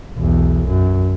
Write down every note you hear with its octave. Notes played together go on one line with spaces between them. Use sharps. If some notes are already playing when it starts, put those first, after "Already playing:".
B1 E2
F#2